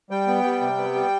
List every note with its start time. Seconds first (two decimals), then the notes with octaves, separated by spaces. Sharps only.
0.10 G3 G5
0.27 B3
0.44 G3
0.61 C3
0.77 B3
0.95 G3